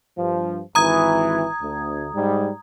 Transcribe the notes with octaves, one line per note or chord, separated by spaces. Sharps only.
G2 F3
G#1 E3 A#5 D#6 G#6
D2
G#2 G3